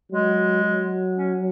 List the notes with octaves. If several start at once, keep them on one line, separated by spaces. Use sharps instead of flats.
F#3 G#3
F#3
C#4